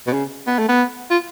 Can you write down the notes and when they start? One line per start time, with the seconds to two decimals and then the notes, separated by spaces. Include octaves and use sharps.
0.07 B2
0.13 C#3
0.47 B3
0.59 A3
0.68 B3
1.10 F4